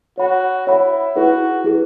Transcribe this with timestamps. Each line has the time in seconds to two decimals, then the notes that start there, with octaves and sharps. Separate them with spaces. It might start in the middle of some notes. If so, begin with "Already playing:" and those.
0.18 F#4 C#5 F#5 B5
0.66 E4 C#5 F#5 B5
1.16 E4 F#4 G#4 B4
1.64 E4 G#4 B4